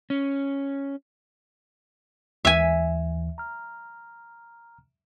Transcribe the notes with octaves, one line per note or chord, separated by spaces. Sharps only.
C#4
D#2 E3 E5 G#5
A#5 F6